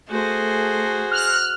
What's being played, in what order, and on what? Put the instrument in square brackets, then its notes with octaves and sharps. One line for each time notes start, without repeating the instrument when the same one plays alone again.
[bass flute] A3 [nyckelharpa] F#4 C5 [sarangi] G#4
[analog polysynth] F6 F#6